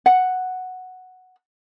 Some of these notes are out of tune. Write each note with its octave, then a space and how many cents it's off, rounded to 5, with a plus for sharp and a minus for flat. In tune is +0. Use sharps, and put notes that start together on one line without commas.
F#5 +0